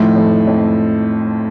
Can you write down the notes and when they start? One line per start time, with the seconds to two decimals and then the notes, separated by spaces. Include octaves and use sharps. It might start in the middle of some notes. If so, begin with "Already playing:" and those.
Already playing: A2 D#3 F3
0.16 F2
0.47 F2